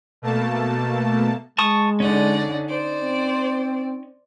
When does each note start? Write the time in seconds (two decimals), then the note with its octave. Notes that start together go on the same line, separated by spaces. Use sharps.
0.22 B2 A3 A#3 A5
1.58 G#3 A5 C#6 D#6
2.00 D3 C#4 D#4 D5 F#5
2.68 C5 D5
3.00 C4